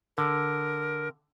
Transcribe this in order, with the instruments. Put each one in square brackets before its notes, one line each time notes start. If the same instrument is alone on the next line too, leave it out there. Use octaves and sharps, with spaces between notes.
[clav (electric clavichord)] D3 [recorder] A#4